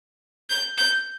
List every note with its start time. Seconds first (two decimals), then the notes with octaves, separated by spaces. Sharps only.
0.50 G6
0.78 G6